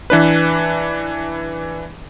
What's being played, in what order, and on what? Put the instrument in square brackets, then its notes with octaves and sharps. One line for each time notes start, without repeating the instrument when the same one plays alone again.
[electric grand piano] E3 D4 B4